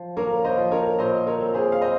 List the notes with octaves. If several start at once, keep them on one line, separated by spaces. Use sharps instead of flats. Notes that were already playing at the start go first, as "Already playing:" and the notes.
Already playing: F3
A#3 A#4 C#5
C5 D#5
F3
A#4 C#5
A#2 C5 D#5
A#4 C#5
C4
G#4 C5
F5
C4 C5 D#5